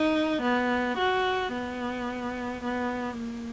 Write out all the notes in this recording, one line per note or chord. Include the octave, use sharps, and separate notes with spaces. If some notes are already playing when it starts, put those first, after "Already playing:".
Already playing: D#4
B3
F#4
B3
B3
A#3